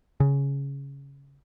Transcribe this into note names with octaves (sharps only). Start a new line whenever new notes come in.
C#3